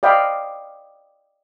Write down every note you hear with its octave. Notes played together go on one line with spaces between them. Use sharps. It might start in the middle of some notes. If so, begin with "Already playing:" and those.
D5 D#5 F5 G5 B5